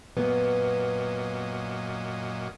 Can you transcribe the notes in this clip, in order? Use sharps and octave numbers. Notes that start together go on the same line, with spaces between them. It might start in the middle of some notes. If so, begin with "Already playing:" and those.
F#2 A#2 B3 D#5